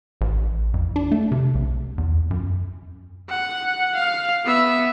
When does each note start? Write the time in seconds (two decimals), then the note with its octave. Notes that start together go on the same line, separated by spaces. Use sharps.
0.21 A1
0.74 F2
0.96 D4
1.11 A3
1.32 C3
1.55 B1
1.98 E2
2.31 F#2
3.30 F#5
3.95 F5
4.45 B3 E5